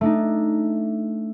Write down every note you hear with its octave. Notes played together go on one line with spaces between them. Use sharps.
A3 D4 D#4